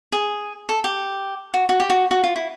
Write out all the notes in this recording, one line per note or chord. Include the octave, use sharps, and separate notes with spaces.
G#4
A4
G4
F#4
F#4
G4
F#4
F#4
F4
E4